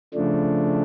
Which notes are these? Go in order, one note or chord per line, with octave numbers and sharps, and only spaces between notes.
C#3 F3 A3 D4